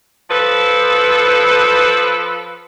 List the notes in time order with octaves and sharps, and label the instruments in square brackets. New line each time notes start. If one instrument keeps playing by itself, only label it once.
[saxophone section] F3 A4 B4